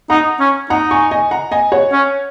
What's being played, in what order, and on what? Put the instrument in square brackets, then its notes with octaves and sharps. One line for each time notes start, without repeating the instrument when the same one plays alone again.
[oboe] D#4 [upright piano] F#5 A#5
[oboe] C#4
[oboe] D#4 [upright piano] F#5 A#5
[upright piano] G#5 C#6
D#5 G#5
F#5 A#5
D#5 G#5
C#5 F#5
[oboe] C#4